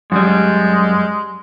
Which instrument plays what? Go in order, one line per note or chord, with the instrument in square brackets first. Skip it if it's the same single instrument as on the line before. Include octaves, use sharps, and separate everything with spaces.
[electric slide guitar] F#2 G3 [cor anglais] G#3